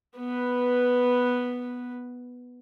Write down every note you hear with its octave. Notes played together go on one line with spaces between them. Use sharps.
B3 B4